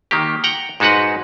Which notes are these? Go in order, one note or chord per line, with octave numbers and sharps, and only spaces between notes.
D#3 A#3 G4
F#5 G5 A#5
G#2 G#3 D#4 F#4 B4 F#5